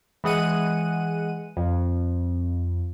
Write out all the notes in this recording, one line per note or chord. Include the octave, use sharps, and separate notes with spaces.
E3 G#3 F#5 D#7
F2